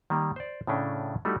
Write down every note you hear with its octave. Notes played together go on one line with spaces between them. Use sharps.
D#3 G3 A#3
C5 D5
A2 C#3 A3 C#4 D4
G3 A3 D#4 E4 F#4